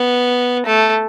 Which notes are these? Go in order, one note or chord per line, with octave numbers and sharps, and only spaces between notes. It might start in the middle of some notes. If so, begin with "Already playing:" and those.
Already playing: B3
A3